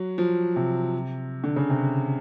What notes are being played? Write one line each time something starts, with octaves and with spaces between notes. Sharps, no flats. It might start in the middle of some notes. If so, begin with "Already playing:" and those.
Already playing: F#3
F3
C3
D3
C#3
C3